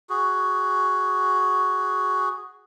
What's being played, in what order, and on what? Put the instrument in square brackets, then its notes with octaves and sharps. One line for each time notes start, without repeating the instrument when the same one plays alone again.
[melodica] F#4 G#4